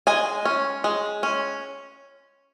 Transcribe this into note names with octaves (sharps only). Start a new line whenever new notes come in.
G#3 G#5
C#4
G#3
C#4